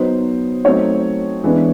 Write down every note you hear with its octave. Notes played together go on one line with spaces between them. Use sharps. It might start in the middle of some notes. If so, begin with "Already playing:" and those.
Already playing: F#3 B3 D#4 C5
F#3 A3 C4 D#4 C#5
E3 G#3 B3 D4